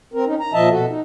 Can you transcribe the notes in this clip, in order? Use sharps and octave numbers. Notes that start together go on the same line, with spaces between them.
C4 A#4
C#4 D#4
A#5
A#2 F3 D#5 E5 A5
B2 F#4 A4
D#4